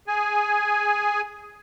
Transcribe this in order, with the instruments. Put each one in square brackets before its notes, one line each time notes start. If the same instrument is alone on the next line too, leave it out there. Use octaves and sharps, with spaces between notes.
[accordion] G#4 G#5